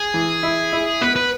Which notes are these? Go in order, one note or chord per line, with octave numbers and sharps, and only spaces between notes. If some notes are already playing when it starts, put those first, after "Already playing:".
Already playing: G#4
E3
E4
E4
B3 B4
B4